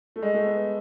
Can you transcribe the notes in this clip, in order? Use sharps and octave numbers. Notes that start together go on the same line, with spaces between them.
A3
G#3
A3
B3